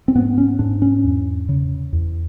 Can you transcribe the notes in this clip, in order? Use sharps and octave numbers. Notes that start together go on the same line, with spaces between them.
C4
G#2 B3
C#4
G#2 D4
C#4
E2
C#3
E2